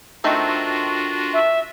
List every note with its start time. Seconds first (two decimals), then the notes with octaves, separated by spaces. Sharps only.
0.24 D#3 A3 C4 D4 F4 F#4
1.33 E5